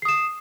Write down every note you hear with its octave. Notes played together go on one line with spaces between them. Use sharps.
D#6 C7 E7